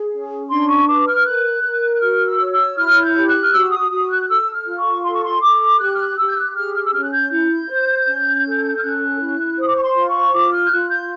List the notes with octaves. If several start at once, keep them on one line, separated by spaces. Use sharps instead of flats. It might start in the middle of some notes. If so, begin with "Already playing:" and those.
Already playing: G#4
C#4
D4 C6
C#6
B4 D6
F6
A#4 F#6
A#4
F#6
F#4 F6
E6
C#5
E6
E4 F6
G6
G4
F#6
F6
F#4 E6
D#6
F#4 D#6
F#6
A4 E6
F6
F4
C#6
A4 C6
C#6
C6
A4 D6
G4 F#6
F6
F#6
G4 E6
G6
F#6
G#4 F6
F6
E6
C#4 F6
F#6
G6
E4 G6
C5
C#4
A4
F6
C#4 F#6
E4
C5 D#6
D6
C#6
C6
F4
C#6
F4 D6
F6
G6
F4 F#6
G6